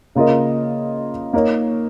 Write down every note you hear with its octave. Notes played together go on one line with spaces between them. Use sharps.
C#3 A#3 F4 A#4 D#5
A#3 D#4 A#4 C#5